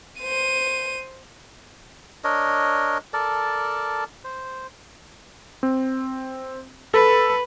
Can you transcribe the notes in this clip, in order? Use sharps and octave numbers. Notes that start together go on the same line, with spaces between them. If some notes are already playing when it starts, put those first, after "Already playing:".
C5 D#7
D4 A#4 C#5 D#5
A4 A#4 D5 A5
C5
C4
A4 B4